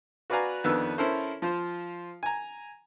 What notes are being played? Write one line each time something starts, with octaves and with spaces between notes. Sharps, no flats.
F#4 B4 D5 F5 G#5 A#5
F2 D#3 B3 D4 B4 E6
C#4 E4 A4 A#4 C5
F3 F4 C5
G#5 A#5